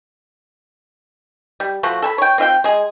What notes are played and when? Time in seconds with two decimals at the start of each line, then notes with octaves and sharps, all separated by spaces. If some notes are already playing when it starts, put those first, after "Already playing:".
1.60 G3
1.83 F3 A3 F#4
2.02 A4 G#5 B5
2.18 C#5 G5
2.38 C4 F4 E5 G5
2.64 G#3 G#4